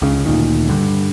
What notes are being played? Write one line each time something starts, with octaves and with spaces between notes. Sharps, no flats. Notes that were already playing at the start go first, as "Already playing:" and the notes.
C#2 C#3
D2 A#2 D#3
G2 D3